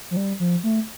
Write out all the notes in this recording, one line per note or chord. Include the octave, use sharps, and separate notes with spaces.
F3
G3
F3
A3